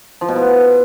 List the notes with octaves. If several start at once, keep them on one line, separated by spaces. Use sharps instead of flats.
F3
B2
B3